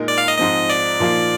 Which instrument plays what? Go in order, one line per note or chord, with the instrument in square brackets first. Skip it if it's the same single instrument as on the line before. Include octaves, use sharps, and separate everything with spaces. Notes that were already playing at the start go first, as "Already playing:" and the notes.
Already playing: [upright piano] A#2 G#3 D#4 A#4
[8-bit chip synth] D5
F5
D#5
[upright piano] G#2 F3 C4 [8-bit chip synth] D#5
[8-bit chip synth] D5
[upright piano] A#2 F3 A#3 F4